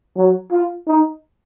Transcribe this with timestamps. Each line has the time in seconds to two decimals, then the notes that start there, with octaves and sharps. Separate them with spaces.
0.17 F#3
0.51 F4
0.87 D#4